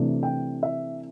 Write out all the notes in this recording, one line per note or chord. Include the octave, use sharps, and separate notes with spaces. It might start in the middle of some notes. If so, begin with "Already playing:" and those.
Already playing: C3 E3 A3 D4
G5
E5